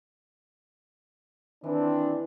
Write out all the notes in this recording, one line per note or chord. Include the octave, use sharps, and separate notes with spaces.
D#3 E3 C4 D4